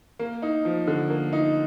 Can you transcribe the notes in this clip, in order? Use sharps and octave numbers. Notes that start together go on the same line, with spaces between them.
A#3
D#4
F3
D3
A#3
D#4